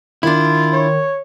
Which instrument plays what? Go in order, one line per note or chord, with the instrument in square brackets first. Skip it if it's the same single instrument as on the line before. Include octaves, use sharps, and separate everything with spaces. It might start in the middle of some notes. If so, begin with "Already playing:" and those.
[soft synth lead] D#3 [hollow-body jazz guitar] D4 E4 [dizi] F4
[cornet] C#5